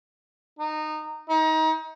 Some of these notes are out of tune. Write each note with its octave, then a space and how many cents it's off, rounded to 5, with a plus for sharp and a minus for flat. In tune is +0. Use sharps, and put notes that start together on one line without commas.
D#4 -20
D#4 +30